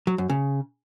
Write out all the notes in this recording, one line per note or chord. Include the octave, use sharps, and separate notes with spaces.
F#3
F#2
C#3